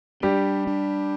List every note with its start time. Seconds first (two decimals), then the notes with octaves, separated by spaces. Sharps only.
0.23 G3 D4 G4
0.67 D4